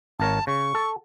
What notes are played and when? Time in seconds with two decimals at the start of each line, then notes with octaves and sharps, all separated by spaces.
0.20 G#1 A#4 C#5 A5
0.47 C#3 C#6
0.75 A4